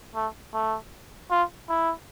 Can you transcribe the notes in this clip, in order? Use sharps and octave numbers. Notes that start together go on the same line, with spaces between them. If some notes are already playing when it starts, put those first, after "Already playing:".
A3
A3
F4
E4